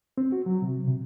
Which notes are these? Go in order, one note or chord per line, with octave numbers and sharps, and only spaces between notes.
C4
F#4
F#3
C3
C3